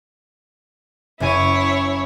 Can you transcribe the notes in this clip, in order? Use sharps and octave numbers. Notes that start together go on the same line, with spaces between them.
F#1 E4 C#5 G#5 D#7